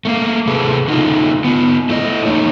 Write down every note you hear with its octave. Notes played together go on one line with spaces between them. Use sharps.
A3 A#3 F5
C3 G#4 A4 B4
D3 D#4 F4
B3 F4
A3 E4 D5 D#5
F2 A#3 D#4 C#5